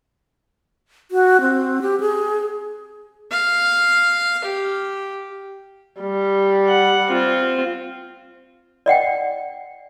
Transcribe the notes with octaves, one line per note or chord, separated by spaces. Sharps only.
F#4
C4
G4
G#4
F5
G4
G3
F#5
C4 F4
D5 D#5 F#5 G5